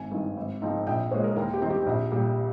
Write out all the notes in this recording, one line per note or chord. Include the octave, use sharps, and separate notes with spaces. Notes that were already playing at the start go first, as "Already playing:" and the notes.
Already playing: G#1 G#5
G2 D#3
G#1
G#2 F3 C4 D#4
A#1 G5
A#2 G#3 C#5
A#4
D#2 A#4
G4
D#3 G3 C4 D#4
G4
A#1
A#2 G3